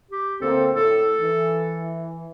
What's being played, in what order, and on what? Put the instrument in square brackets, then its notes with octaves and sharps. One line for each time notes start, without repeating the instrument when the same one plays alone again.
[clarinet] G4
[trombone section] D2 A#3 C4 [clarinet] A4
[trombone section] A2 [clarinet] A4
[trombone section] E3